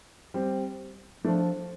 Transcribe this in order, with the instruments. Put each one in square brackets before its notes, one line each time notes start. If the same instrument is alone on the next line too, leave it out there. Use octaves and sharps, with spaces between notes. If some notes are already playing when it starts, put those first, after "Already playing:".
[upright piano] G3 C4
[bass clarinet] F3 [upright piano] A3 D4